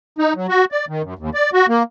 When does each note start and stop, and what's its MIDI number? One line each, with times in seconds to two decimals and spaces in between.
0.19 0.33 63
0.36 0.47 54
0.49 0.65 66
0.72 0.85 74
0.88 1.02 51
1.03 1.14 42
1.19 1.30 39
1.34 1.50 74
1.53 1.66 66
1.69 1.83 58